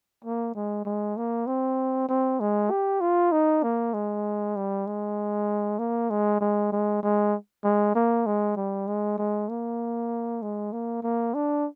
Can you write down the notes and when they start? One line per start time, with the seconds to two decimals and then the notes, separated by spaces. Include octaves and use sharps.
0.24 A#3
0.55 G#3
0.85 G#3
1.17 A#3
1.47 C4
2.09 C4
2.40 G#3
2.70 G4
3.01 F4
3.32 D#4
3.63 A#3
3.94 G#3
4.56 G3
4.87 G#3
5.79 A#3
6.10 G#3
6.41 G#3
6.72 G#3
7.03 G#3
7.64 G#3
7.95 A#3
8.26 G#3
8.56 G3
8.87 G#3
9.18 G#3
9.49 A#3
10.42 G#3
10.72 A#3
11.03 A#3
11.34 D4